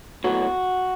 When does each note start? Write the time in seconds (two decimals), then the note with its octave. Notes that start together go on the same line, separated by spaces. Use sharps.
0.24 A2 F#3 B3 F#4